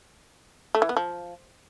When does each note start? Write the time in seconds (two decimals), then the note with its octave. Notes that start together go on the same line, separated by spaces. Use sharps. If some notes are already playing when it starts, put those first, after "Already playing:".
0.75 A3
0.82 E3
0.89 B3
0.97 F3